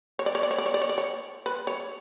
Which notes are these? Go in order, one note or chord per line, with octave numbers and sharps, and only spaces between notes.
C#5
D5
C#5
D5
C#5
D5
C#5
D5
C#5
D5
C#5
B4
C#5